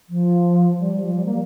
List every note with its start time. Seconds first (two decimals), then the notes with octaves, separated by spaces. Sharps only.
0.09 F3
0.79 G3
0.97 F3
1.15 G3
1.25 A#3